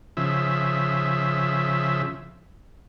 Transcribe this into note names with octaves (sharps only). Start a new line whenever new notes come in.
C#3 F3 E5